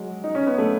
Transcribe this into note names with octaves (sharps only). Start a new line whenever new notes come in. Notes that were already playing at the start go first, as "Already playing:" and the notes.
Already playing: F#3 G#3
D#4
C#4
B3
A3